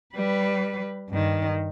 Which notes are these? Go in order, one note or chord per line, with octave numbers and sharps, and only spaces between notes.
G3 B4
G2 D#3